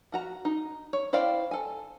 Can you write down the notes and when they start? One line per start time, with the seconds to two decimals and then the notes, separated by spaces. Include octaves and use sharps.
0.12 F3 F#4 A#5
0.45 D#4
0.93 C#5
1.13 E4 C5 D5 F5 G5
1.51 A4 G#5